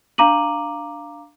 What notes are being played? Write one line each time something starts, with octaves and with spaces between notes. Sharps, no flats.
D4 F5 A#5 D6 D#7 F#7